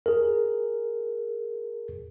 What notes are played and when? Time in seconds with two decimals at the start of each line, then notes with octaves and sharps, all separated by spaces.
0.06 G#4 A#4